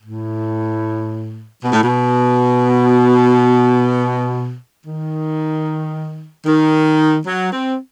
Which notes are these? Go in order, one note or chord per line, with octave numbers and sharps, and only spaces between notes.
A2
B2
A2
B2
D#3
D#3
F#3
C4